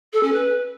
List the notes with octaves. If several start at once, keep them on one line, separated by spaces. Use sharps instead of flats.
A4
C#4
B4